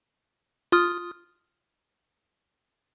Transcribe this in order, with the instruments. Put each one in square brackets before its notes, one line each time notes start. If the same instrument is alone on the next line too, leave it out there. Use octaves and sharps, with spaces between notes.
[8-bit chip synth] F4 D#6 F6